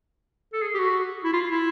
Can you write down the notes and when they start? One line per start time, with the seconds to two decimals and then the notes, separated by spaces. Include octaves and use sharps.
0.53 A4
0.62 G#4
0.74 G4
0.79 F#4
1.24 E4
1.33 F4
1.51 E4